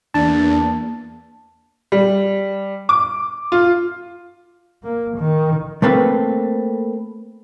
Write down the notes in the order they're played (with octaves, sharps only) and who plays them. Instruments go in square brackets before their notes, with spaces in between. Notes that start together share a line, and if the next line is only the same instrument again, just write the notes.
[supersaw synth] E2 [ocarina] A#3 [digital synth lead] D4 [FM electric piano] A5
[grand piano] G3
D6
F4
[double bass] A#3
D#3
[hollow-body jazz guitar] A3 A#3 C4 A4 B4